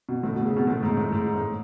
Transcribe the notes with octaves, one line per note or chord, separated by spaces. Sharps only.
B2
A2
B2
C#3
B2
A2
G#2
A2
G#2
A2